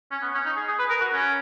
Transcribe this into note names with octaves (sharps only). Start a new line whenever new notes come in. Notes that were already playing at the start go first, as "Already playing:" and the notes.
C#4
B3
C#4
D#4
G#4
G#4
B4
A#4
F#4
C#4